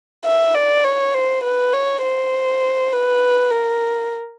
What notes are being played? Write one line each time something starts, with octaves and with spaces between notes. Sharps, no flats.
E5
D5
C#5
C5
B4
C#5
C5
B4
A#4